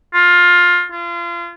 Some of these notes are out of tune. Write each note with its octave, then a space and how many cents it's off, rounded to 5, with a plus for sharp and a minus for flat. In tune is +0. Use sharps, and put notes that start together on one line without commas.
F4 +15
F4 -30